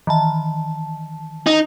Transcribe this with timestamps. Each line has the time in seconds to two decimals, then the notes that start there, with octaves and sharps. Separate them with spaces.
0.07 D#3 E3 A5
1.47 D#4